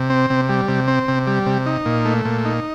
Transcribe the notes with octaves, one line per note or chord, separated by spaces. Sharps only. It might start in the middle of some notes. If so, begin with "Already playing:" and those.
Already playing: C3
C4
C3
G3
C3
C4
C3
G3
C3
D#4
A#2
A3
A#2
D#4